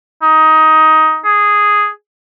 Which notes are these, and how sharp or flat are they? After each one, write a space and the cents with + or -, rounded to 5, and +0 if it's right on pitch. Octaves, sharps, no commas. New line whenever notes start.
D#4 +15
G#4 -5